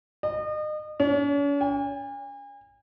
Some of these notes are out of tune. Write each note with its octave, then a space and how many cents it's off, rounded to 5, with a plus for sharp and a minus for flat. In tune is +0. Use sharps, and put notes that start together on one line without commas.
D#5 -35
C#4 +45
G#5 -40